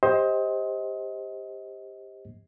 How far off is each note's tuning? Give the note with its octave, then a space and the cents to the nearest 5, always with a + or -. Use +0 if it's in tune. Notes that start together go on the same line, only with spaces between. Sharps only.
G4 +15 C5 +15 D#5 +25